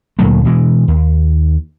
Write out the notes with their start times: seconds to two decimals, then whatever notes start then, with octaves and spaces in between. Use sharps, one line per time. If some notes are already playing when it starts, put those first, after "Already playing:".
0.19 D2 A#2 F#3 A3
0.45 B2 E3 G#3
0.88 D#2